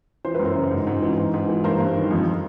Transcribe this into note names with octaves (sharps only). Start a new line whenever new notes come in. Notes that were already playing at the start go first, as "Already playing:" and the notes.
E3 C5
F#2 B4
A#4 C5
C#3
G#2
G#2
E3
G#2
G#2
E3
G2 A#4 C5
G2
D#3
F2